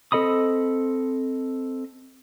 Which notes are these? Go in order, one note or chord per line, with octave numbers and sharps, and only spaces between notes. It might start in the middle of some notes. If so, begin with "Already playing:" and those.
C4 A4 D#5 B5 D#6